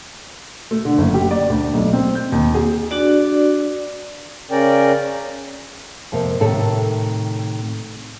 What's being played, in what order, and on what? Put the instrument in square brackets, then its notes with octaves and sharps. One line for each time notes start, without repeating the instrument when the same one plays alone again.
[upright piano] A3
D3
F#1
G4
D5
D2
B1
C4
G6
D#2
G#4
[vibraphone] D4 F#4 D5
[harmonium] C#3 C#4 A#4 D5 G5
[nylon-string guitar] F2 C3 A#3
A2 C3 D#3 A4